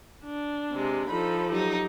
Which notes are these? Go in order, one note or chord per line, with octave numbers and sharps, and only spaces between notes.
D4
C3 G#3
F3 D#4 A4 B5
F#3 D#4 G4